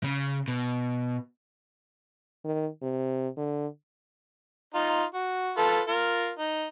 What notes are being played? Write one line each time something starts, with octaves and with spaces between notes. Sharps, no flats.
C#3
B2
D#3
C3
D3
D#4 F4
F#4
F4 A4 B4
F4 A#4
D#4